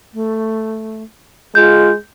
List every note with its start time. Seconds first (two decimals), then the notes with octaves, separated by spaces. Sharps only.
0.13 A3
1.55 G#3 F4 G6